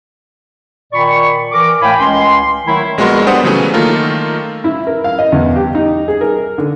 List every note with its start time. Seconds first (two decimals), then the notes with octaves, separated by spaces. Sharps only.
0.92 A#2 D#3 D5 B5 C#6
1.52 E3 A#4 D6
1.82 A2 A3 F5 G5 G#5 B5
2.00 C#2 G#3 C#4 C6
2.66 D#3 F#3 A3 E4
2.98 A#1 G#3 B3 F#4 A#4 C6
3.27 G3 B3 D4 C5 F#5 D#6
3.44 C#3 E3 F#3 A3 C#4
3.74 D#3 A3 A#3 F4 A4 A#4
4.64 E4
4.87 A#4
5.04 F5
5.19 D#5
5.32 E2
5.56 G4
5.75 D#4
6.08 G#4
6.21 A#4
6.58 D3